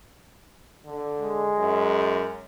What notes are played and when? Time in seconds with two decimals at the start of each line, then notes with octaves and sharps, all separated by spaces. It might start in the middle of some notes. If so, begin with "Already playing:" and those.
0.86 D3
1.20 G#3
1.58 F#2